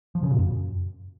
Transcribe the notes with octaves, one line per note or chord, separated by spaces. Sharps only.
F3
C#3
A#2
F#2